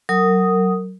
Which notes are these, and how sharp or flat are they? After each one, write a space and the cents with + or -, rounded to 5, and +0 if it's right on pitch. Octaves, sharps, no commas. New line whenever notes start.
F#3 +15 A#4 -30 D#6 +0